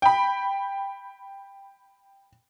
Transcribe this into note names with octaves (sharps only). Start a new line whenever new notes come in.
G5 B5